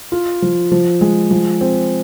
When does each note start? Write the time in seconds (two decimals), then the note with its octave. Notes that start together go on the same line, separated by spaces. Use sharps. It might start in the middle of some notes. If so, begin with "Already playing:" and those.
0.12 F4
0.42 F3
0.72 F3
1.01 G#3
1.31 F3
1.61 C4